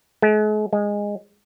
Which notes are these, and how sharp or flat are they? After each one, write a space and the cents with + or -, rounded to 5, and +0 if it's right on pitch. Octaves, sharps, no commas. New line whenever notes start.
G#3 +40
G#3 -15